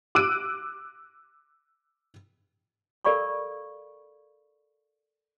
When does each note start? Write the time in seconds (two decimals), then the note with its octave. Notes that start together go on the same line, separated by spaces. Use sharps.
0.15 D6 E6 F#6 D7 D#7
3.05 A4 A#4 D5 F5 B5 C#6